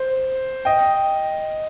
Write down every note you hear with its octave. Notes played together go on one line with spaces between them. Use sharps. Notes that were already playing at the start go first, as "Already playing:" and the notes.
Already playing: C5
D#5 G5